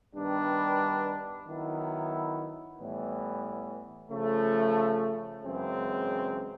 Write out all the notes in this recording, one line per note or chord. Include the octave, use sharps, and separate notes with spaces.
G2 D#3 G3 B3 D4
D#3 F#3 B3 E4
A2 E3 G3 B3
C#3 F3 A3
F#2 C#3 E3 G#3 C4